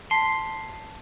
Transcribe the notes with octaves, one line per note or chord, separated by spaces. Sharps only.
A5 C6 B6